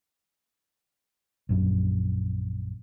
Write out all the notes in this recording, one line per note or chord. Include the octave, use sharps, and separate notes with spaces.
A#1 F#2